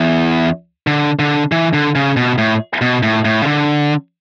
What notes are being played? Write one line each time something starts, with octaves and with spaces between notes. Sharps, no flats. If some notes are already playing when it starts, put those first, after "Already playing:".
Already playing: E2
D3
D3
E3
D3
C#3
B2
A2
B2
A2
A2
C#3
D3